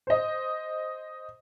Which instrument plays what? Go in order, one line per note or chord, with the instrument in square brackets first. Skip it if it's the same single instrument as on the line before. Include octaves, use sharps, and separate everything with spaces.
[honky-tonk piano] C5 D#5